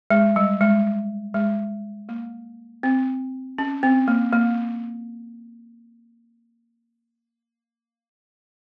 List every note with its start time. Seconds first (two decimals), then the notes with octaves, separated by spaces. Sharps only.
0.10 G#3
0.36 G3
0.61 G#3
1.34 G#3
2.09 A#3
2.83 C4
3.58 C#4
3.83 C4
4.08 A#3
4.33 A#3